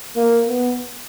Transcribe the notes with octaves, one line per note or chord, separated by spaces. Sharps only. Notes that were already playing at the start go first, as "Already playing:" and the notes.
A#3
B3